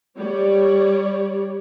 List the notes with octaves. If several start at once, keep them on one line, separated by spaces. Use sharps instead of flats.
G3 C#5 D5